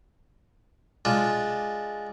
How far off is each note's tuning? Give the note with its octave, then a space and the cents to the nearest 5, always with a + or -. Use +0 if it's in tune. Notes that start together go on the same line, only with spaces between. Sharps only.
G#3 +0 D4 +0 F4 +0